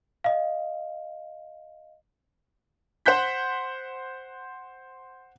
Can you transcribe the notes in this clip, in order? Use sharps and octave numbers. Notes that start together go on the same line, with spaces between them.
D#5 F5
C5 F#5 F#6 G6 B6